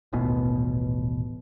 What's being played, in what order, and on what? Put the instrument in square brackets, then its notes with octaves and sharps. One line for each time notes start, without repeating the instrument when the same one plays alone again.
[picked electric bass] D#1 A1 B2